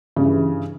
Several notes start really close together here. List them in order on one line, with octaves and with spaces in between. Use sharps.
C#3 G2 E3